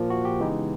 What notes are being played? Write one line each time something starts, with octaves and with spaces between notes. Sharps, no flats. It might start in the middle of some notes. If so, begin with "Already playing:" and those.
Already playing: A#2 F3 A#3
F#4
G4
C#3 E3 G#3 B3 D#4